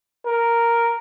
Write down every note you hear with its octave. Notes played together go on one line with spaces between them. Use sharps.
A#4